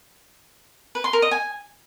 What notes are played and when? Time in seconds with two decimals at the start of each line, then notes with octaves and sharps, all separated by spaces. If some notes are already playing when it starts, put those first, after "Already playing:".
0.95 B4
1.04 C6
1.13 A#4
1.22 D#5
1.31 G#5